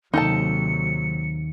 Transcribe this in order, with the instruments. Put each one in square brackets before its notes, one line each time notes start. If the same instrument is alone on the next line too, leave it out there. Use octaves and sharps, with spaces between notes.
[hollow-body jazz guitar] D#2 [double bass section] C3 F#3 [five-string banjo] D#4 A4 A5 [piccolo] C#7